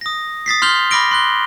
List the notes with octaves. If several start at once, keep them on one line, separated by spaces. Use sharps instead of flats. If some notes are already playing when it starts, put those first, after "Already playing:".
D#6 A#6
D#6 A6 B6 C7
C6 F6 G6 F7 G7
B5 D6 F6 A#6 D7 G7
C6 F#6 G7